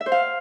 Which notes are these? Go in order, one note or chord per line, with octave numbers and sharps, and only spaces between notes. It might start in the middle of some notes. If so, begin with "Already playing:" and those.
E5
C5
F5